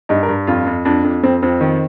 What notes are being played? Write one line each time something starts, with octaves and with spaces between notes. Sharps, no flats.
G2 D#4
A#4
G2
F2 F4
F2
F2 D4
F2
F2 C4
F2 C4
D#3